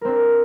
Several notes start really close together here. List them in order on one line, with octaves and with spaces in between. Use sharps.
A#4 C4 D4